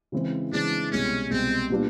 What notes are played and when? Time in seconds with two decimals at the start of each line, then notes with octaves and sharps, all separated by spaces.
0.12 C#3 E3 G#3 C4
0.52 C#3 E3 G#3 C4 D4
0.91 C2 B2 G#3 C#4
1.30 C2 B2 G#3 C4
1.70 A#2 G3 B3 D4 F4